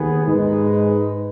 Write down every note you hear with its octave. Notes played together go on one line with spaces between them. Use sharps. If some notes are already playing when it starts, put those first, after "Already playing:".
Already playing: D#2 D#3 B3 G#4
G#2 G#3 D#4 B4